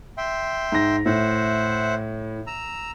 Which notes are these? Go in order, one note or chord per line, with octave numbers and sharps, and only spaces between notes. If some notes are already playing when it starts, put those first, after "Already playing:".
E5 G5 C6
G#2 A#6
A2 C5 E5 F#5
A#5 E6